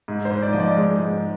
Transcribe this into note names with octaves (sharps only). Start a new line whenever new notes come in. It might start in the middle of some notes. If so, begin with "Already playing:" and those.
G#2
C5
G#2
D5
F3 D#5
D5
G#3
G#2